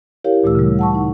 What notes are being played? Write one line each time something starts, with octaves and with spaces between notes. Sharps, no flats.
E4 G4 A#4 C#5 F5
D2 A#2 E3 A3 E6
C#3 G3
F#5 A5 C#6
D#4